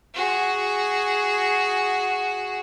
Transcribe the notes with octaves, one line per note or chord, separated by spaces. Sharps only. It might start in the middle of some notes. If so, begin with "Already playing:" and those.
F#4 G#4